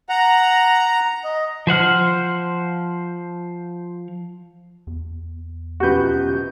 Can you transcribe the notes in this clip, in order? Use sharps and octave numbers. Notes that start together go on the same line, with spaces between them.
F#5 A#5
D#5
F3 C5 F#5 F6
E2
F#2 B2 F3 F#4 G4 B4 G6